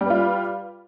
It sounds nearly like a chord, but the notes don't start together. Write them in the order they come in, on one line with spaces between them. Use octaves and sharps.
G3 B4 F4